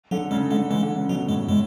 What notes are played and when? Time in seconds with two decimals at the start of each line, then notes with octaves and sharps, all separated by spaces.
0.11 D3 F#3
0.31 C#3 G#3
0.51 D3 G#3
0.70 E3 G#3
0.83 D3
0.97 C#3
1.09 B2 F#3
1.29 A2 G#3
1.48 A2 G#3